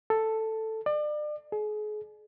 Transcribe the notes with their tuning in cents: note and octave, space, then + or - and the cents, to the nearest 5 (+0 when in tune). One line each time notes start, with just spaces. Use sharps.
A4 +5
D5 +35
G#4 +35